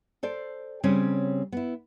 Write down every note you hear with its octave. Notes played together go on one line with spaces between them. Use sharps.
A4 C5 D5
C#3 G3 C4 C#4
B3 E4